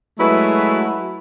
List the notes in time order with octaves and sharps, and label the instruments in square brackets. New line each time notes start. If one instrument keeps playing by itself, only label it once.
[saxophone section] F#3 G#3 A3 E4 F#4 B4